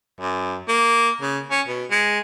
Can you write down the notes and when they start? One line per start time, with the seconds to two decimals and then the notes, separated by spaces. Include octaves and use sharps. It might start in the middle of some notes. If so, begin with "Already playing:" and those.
0.21 F#2
0.68 A#3
1.21 C#3
1.51 C#4
1.68 B2
1.90 G#3